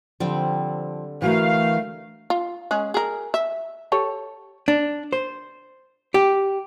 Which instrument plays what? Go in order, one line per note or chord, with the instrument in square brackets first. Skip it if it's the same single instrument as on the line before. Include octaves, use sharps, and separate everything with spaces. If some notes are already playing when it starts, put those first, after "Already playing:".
[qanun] D3 G3 C4 [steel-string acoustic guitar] F3
[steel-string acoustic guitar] E3 F#4 A#4 [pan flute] A3 [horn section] F5
[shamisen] F4
G#3 C#4 G#4
G#4 A#4
E5
G4 A4 C#5
[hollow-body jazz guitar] D4
C5
G4